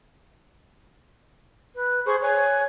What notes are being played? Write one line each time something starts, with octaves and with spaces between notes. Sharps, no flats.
B4
G#4 C5 C#6
C#5 G#5 F#6